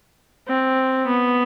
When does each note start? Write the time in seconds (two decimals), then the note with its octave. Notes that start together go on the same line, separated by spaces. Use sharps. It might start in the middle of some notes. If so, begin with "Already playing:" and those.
0.48 C4
1.07 B3